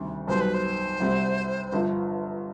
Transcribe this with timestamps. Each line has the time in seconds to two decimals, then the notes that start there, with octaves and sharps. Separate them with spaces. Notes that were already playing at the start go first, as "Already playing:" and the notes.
Already playing: D2 C3 D#3 G3
0.27 B1 B2 G3 C5
0.41 B4
0.54 C5
1.00 C2 C3 G3 C4
1.72 G1 G2 F3